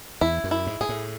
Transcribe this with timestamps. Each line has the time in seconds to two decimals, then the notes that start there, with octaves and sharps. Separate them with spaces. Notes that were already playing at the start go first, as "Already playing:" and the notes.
0.21 E2 E4
0.44 F#2
0.51 E4
0.67 G#2
0.81 G#2 G#4
0.89 A2